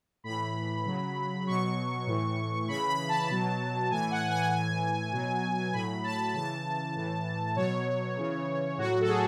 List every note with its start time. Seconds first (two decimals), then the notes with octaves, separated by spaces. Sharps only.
0.24 A2 E3 B5
0.85 C#3 F#3
1.47 B2 F#3 C#6
2.07 A2 E3
2.68 C#3 E3 B5
2.88 B5
3.09 A5
3.30 B2 F#3
3.90 A2 E3 G#5
4.11 F#5
4.31 G#5
4.51 A2 E3
5.12 B2 F#3
5.73 A2 F#3 B5
6.04 A5
6.34 C#3 E3 A5
6.95 A2 E3
7.56 B2 F#3 C#5
8.17 C#3 E3
8.78 A2 F#3 F#4
9.01 A4
9.08 G#4